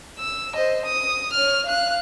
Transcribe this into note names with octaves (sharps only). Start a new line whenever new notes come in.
E6
C5 D#5
D#6
C#5 F6
F5 F#6